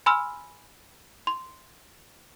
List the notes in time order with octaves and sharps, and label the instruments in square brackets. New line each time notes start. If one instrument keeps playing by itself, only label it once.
[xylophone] G#5 B5 C6 E6 F6
C6